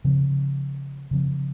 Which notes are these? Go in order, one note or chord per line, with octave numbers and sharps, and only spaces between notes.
C#3 F3 C4
C#3 F3 C4